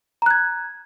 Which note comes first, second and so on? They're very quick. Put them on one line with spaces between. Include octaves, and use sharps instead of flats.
A#5 F#6 G#6